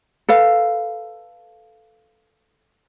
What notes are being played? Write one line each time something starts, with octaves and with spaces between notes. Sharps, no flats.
A4 B4 F5